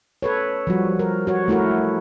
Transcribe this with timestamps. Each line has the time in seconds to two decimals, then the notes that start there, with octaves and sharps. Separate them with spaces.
0.22 A4 B4 C#5
0.67 F3 G3 F#4
0.99 A#4
1.27 F#4 C#5
1.48 A3 E4 F#4 A#4